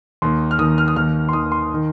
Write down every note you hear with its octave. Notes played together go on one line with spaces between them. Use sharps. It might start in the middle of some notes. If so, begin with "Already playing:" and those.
D#2 D#3 C6
F6
D#2 D#3 D#6
F6
D#6
D#2 D#3 F6
C6
D#2 D#3 D#6
C6
D#3